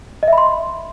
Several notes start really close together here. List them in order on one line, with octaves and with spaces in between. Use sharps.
D#5 E5 B5 C6